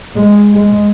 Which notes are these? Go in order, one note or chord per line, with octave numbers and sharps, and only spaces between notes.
G#3
G#3